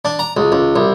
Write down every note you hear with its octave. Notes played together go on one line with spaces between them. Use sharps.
D4
A#5
C#2
C#2
C2